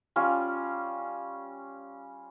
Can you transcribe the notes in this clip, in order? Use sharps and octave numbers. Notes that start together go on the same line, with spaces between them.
G3 C#4 F4